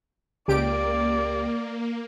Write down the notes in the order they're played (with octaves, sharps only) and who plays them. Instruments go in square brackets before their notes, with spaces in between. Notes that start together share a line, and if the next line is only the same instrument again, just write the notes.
[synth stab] C#2 G4 D7 [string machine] A#3 [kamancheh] D5